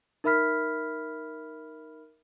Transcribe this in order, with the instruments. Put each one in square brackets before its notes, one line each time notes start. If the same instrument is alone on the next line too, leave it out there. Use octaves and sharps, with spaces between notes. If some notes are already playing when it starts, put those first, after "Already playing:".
[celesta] D#4 A#4 E5 B5 F6 B6